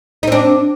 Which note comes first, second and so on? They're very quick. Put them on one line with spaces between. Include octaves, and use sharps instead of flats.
D#4 C4 D4